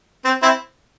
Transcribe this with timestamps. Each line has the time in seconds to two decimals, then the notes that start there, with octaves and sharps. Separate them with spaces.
0.25 C4
0.42 C4 E4